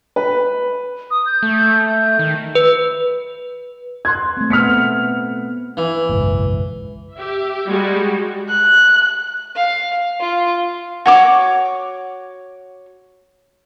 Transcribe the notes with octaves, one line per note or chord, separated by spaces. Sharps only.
B4
D#6
G6
A3
D#3
B4
C6 F#6 G#6
A3 C4
B3 F6 B6 C#7
E3
F#1 B1 G#2
G4 E5
G3 G#3 F#4 G4
F#6
F5
F4
F#4 C#5 D6